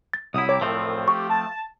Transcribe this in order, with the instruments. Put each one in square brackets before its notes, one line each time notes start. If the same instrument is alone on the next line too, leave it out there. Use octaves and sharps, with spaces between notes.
[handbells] A6
[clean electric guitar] C2 E4 [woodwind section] F#3 D#6
[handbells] C#5 [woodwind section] G5 A#5 D6
[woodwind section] C2 F#2 A2 [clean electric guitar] F3 A3 C4
[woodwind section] G4 [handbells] C#6
[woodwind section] A5